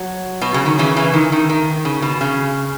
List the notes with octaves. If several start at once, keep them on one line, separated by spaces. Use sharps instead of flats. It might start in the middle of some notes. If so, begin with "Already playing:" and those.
Already playing: F#3
B2
C#3
D#3
C#3 E3
C#3 E3
D#3
D#3
D#3
C#3
B2
C#3